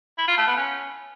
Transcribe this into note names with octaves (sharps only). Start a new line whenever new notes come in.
E4
F4
A3
B3
C#4